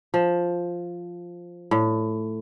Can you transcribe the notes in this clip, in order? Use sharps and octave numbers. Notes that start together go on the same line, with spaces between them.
F3
A2